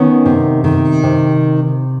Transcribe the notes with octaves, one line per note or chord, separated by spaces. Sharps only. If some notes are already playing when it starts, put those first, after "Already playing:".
Already playing: D#3 B3 C#4
C3
D#3
C3